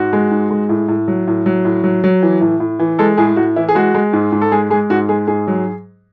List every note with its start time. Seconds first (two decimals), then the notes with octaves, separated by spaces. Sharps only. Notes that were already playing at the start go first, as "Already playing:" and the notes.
Already playing: G#2 F#4
0.13 G#3
0.31 G#2
0.50 G#3
0.69 A2
0.88 A2
1.08 F#3
1.27 A2
1.46 F#3
1.65 A2
1.84 F#3
2.04 F#3
2.23 E3
2.41 A2
2.60 A2
2.79 E3
2.99 G#3 A4
3.17 A2 G#4
3.36 A2 F#4
3.56 E3 E4
3.69 G#4
3.75 G#3 F#4
3.95 G#3
4.13 G#2
4.32 G#2
4.41 A4
4.52 G#3 G#4
4.70 G#3 G#4
4.90 G#2 F#4
5.09 G#3 G#4
5.28 G#2 G#4
5.48 F#3